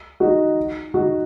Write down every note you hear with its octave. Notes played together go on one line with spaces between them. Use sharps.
D#4 F#4
D#4 F#4